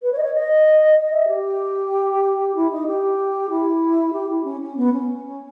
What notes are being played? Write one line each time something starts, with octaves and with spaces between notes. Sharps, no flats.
B4
C#5
D#5
C#5
D#5
D#5
E5
G4
E4
D#4
G4
E4
G4
E4
C#4
C#4
B3
C#4